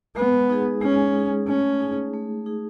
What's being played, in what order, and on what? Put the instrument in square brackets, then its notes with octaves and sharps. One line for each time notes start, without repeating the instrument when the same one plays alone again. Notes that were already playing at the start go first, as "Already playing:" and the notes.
[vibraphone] G#3 [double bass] B3
[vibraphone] D#4 G#4
[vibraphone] G#3 [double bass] C#4
[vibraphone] D#4 G#4
[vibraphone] A3 [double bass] C#4
[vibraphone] D#4 G#4
A3
D#4 G#4